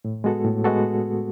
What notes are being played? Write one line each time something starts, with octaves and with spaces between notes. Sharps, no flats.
A2
G#3 B3 F#4 A4
A2
G#3 B3 F#4 A4